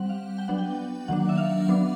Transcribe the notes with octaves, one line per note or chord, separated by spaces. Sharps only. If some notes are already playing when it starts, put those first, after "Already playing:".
Already playing: G3 C4 F#5
F5
G5
F#3 B3 D4 F#5
G5
D#3 F#3 A#3 D4 F#5
E5
F5
F#3 B3 D4